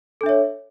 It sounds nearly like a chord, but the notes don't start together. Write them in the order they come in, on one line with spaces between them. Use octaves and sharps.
A4 D4 E5 C#5